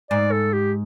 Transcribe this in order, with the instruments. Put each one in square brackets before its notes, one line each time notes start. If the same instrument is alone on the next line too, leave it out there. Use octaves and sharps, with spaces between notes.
[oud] G#2 [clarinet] D5
[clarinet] A4
G4